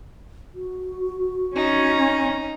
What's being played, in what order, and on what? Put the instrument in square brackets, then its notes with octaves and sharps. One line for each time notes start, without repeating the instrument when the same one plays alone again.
[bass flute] F#4
[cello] C#4 [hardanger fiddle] D#4